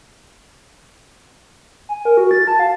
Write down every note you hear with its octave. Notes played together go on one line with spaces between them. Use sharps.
G#5
A#4
F#4
A6
A5
F5